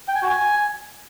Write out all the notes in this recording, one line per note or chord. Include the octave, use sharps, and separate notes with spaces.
G5
G#5
F#4
G#5